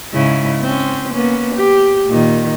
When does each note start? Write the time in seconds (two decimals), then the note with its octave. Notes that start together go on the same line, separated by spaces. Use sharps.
0.13 G#2 C#3 E4
0.61 C4 C#4
1.12 A#3 B3 C#4
1.55 G4
2.08 A#2 D#3